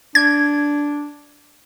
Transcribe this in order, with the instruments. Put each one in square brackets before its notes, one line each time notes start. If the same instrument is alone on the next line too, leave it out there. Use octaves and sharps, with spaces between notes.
[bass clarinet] D4 [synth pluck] G#6